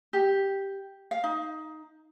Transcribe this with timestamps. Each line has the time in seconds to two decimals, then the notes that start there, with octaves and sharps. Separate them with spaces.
0.13 G4
1.11 F5
1.24 D#4